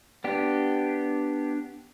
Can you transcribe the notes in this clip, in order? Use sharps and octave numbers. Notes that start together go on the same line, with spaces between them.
B3 D4 G4